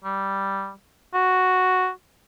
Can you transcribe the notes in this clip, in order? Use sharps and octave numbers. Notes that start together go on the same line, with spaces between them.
G3
F#4